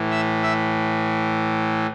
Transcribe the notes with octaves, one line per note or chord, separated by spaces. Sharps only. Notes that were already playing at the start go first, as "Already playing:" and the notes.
Already playing: A2 E3
E5 E6
E5 E6